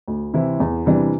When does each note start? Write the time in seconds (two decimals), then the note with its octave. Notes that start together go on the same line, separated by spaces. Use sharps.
0.08 D2
0.34 C3 E3 C4 E4
0.60 E2
0.86 C3 E3 G3 D4